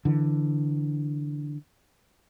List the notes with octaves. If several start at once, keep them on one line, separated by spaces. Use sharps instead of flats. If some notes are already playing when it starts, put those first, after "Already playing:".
D3 E3